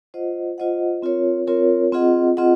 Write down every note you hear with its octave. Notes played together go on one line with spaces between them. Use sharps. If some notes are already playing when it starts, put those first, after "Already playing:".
F4 C5 D#5 F#5
F4 C5 D#5 F#5
C4 F4 A#4 C#5
C4 F4 A#4 C#5
C4 F4 G#4 D#5 F#5
C4 F4 G#4 D#5 F#5